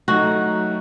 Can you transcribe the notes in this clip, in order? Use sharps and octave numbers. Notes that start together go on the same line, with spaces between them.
F#3 A3 D#4 F#4